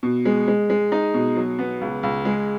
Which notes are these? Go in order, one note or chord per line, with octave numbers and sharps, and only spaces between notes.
B2
G#3
G#3
G#3
D#4
B2
F#3
B3
C#2
C#2
G#3